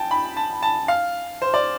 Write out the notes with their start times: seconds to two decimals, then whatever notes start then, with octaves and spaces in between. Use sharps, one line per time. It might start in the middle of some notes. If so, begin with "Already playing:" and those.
Already playing: G5 A5
0.11 B5
0.37 A5
0.63 A5
0.88 F5
1.42 C5
1.54 D5